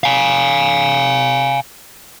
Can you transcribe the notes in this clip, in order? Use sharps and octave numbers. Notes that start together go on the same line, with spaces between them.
F5 G#5